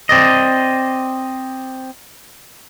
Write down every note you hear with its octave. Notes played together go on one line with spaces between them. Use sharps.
C4 D5 D#5